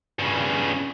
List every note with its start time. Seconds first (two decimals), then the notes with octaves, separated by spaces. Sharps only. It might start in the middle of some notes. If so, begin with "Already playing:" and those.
0.19 G2 C#3